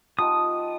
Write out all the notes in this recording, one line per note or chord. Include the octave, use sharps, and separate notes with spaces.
F3 B3 D#4 G4 D#6